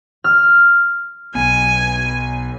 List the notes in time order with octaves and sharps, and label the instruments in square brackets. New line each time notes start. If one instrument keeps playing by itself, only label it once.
[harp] F6
[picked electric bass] B1 B3 [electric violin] G#5